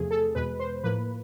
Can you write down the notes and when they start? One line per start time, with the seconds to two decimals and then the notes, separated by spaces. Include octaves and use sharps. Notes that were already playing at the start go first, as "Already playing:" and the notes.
Already playing: E2 C3 F3 A3 G#4
0.11 A4
0.35 E2 B2 G#3 B4
0.59 C5
0.84 A2 F3 A#3 B4